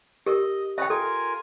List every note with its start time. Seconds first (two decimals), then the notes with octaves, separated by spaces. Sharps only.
0.26 G4 A#4 D#5
0.78 C#4 B4 E5 G5 D#6
0.90 F4 A4 A#4 G#5